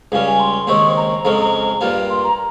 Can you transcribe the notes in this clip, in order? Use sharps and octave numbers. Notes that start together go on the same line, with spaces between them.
C#2 C#3 G3 C#4 F5
G#5
C6
D#2 C#3 G#3 C4 D#4 C#6
A#5
F2 C#3 F3 G#3 C#4
G2 G3 A#3 F4
C6
A#5